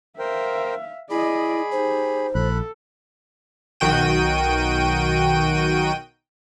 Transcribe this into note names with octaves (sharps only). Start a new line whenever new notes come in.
A#4 C5 E5 F5 G5
E4 G#4 D5 D#5 B5
D#4 G4 C5
A#1 A4 B5 F#6
B1 D#3 F#4 G5 D#7